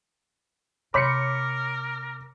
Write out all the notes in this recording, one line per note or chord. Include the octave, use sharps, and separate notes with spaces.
C3 A#4 C#5 B5 C6 D6 B6 C#7